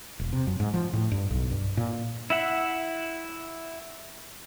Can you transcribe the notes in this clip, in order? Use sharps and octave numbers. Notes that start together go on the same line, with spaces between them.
E1
C3
F#2
G#2
F3
A2
G2
B1
G2
A#2
E4 E5 F#5